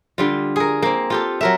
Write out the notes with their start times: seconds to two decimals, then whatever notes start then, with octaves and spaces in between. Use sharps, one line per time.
0.18 D3 G3 F4
0.56 G#4 A#4
0.82 A#3 C4
1.10 F4 G4 A4
1.41 F#3 A#4 E5